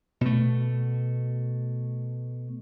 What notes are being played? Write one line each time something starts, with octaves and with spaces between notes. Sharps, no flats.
B2 A3